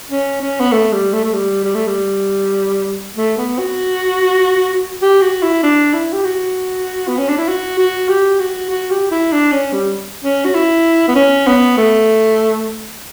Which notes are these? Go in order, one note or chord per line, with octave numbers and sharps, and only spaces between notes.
C#4
C#4
B3
A3
G3
A3
A3
G3
G3
A3
G3
A3
B3
F#4
G4
F#4
E4
D4
E4
G4
F#4
B3
C#4
D4
E4
F#4
F#4
G4
F#4
F#4
G4
E4
D4
C#4
G3
C#4
F#4
E4
B3
C#4
B3
A3